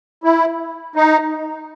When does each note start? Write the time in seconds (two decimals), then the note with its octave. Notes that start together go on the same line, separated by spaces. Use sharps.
0.24 E4
0.96 D#4